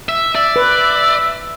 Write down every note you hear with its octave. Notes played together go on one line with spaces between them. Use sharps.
E5
D5 E5
B4